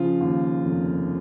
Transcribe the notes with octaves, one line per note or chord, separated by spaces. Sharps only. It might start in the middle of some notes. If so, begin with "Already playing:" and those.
Already playing: C#3 F3 F4
D#2
F1